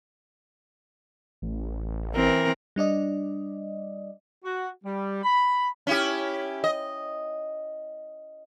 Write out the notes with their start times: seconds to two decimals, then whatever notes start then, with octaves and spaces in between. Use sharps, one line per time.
1.42 A1
2.14 E3 C4 A#4
2.76 G3 D4 D5 D#5
4.44 F#4
4.84 G3
5.23 B5
5.87 C#4 E4 G4
6.64 D#5